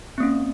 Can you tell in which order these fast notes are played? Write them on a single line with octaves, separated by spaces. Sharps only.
C4 A#3 C#4